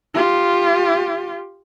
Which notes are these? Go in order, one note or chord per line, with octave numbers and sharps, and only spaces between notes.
F4 G4